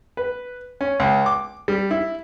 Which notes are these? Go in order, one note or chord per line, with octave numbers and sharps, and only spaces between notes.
B4
C#4
C#2
D6
G3
E4